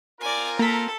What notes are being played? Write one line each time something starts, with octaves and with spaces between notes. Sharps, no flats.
C4 F4 A#4 D5 G#5
A#3 A4 A#5 B6